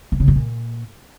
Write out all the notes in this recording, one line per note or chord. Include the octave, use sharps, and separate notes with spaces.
D3
C#3
G#2
A#2